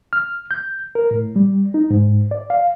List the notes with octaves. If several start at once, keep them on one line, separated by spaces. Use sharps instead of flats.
F6
G6
A#4
A2
G3
D#4
G#2
D5
F5